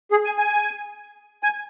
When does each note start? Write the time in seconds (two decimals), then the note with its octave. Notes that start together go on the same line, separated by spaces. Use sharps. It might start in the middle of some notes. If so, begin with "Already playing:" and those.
0.11 G#4
0.25 G#5
0.38 G#5
1.43 G#5